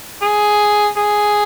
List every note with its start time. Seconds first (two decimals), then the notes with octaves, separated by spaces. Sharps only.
0.22 G#4
0.97 G#4